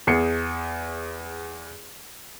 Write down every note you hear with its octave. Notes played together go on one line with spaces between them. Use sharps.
E2 G#4 C7 C#7